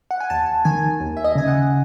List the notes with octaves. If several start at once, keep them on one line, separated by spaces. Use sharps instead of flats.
F#5
G#5
D#2 A5
D#3 G#5
D#2
E5
D#5
C#3 G#5
F#5